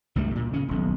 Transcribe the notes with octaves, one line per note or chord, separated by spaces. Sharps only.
C#2 G2 G3 A3
A#2
C#3 C#4
D#1 B1